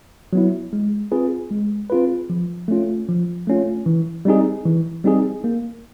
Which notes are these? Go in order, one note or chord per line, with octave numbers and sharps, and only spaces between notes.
F#3 B3 E4
G#3
C4 F4 G#4 B4
G#3
C4 F4 G#4 B4
F3
A3 C#4 F4
F3
A3 C#4 F4
E3
G3 C4 D#4 G#4
E3
G3 C4 D#4 G#4
A#3